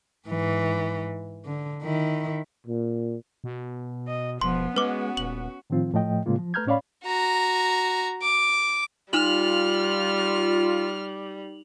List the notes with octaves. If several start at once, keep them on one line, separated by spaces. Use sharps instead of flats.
G#2 E3
D3
D#3 E4
A#2
B2
D#5
E1 F3 B3 C6
G#3 C#4 F#4 B4 D6
D#1 F#7
A2 D#3 F3 C4 F4
A2 F3 A3 D#5 G5
A2 C#3 G#3 A#3 F4
F3
A3 B4 A#5 F6 G6 G#6
A2 C#4 C#5 D5 F5 B5
F#4 A#5
D6
G3 D#4 F4 F6 F7 F#7